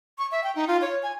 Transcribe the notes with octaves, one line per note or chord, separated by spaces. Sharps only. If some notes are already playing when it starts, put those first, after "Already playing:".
C#6
E5
G5
D#4
F4
C#5
G#5